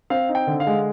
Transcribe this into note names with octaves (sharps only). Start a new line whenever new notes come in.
C4 F5
D#4
G5
D3
F5
G#3